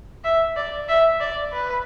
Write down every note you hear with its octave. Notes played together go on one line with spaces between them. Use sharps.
E5
D5
E5
D5
B4